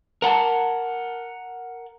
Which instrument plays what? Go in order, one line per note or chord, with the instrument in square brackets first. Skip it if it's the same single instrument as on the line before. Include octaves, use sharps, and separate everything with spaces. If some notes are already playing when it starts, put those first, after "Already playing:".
[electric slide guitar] A#4 F#5 G#5 A5